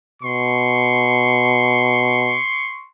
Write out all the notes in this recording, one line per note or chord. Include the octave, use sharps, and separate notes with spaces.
B2 C6 C#6